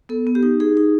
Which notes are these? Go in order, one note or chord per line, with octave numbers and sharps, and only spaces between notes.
B3 A4
B3
G4
D#4
D#4 G#4
D#4